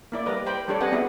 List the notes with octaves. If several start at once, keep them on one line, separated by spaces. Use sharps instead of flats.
A#3 E4 D5
G3 A#4 B4 D#5
C5 G5 B5
G3 D4 G4 A4 C#5 D5
C4 B4 D#5 F#5 G#5
B3 E4 F#4 G#4